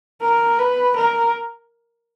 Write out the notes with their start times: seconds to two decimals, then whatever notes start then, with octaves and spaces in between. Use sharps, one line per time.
0.22 A#4
0.59 B4
0.96 A#4